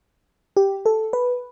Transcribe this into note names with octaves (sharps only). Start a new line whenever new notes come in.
G4
A4
B4